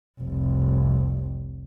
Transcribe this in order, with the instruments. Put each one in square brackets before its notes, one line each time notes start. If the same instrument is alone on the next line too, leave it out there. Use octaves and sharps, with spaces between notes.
[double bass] F1 C2